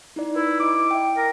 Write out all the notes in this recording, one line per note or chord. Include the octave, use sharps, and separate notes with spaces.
D#4 E4 D5
E4 B4
E4 D#5 D6
E5 G5
A#4